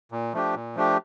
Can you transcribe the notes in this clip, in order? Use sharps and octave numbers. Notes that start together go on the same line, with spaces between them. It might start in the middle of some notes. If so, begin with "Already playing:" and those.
A#2
F3 A3 D4 G4
A#2
F3 A3 D4 G4